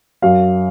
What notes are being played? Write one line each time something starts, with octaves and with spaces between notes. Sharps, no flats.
F#2 F5